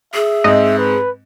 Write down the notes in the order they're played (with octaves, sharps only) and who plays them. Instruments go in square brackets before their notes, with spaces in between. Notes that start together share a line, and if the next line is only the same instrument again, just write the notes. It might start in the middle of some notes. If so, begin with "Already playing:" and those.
[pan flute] G#4 [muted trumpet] E5
[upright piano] G#2 C4 [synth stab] D#5
[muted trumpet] B4